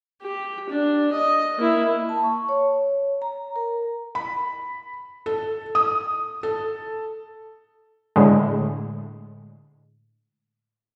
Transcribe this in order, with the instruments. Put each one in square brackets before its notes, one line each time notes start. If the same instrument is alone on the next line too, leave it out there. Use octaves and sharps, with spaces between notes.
[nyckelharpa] G4
D4
D#5
A#3 E4
[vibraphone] A5
C#6
C#5
A#5
A#4
[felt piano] B5
A4
D#6
A4
[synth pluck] A2 D3 G#3